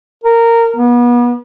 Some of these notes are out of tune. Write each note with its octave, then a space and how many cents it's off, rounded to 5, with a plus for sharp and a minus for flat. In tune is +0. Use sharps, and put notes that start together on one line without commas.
A#4 -15
B3 -35